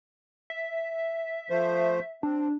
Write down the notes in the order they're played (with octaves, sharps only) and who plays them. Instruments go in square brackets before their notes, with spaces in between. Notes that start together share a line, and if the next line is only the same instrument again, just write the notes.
[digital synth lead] E5
[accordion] F3 A3 C5
[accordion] C4 [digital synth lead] D4